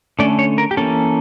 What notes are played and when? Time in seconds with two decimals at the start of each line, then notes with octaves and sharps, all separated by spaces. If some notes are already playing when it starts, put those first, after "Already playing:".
0.19 D3 A3 C#4 D5
0.39 C#5
0.58 A#4
0.71 G4
0.77 E3 A#3 C#4 A4